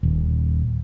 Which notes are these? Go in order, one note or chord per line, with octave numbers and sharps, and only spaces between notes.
D#1